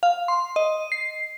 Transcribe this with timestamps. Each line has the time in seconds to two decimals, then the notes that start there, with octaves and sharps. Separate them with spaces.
0.03 F5
0.28 C6
0.56 D#5
0.92 C7